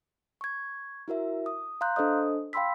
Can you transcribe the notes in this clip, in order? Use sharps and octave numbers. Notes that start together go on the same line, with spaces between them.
C#6 G#6
E4 F#4 A#4 E5
D#6
F5 A#5 C6 F#6 G6
D4 A4 C5 D#5 D#6
F5 G5 B5 C6 E6 B6